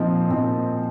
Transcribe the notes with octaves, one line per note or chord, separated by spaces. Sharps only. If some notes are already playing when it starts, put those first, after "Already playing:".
Already playing: A#2 F3 C4 D#4
A#2 F3 C4 D#4